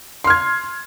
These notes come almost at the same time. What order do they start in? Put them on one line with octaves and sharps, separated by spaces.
C6 F6 G#6